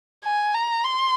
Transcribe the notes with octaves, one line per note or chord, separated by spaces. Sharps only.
G#5
A#5
C6